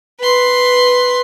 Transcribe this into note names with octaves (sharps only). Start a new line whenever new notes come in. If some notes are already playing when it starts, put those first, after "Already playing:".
B4 C6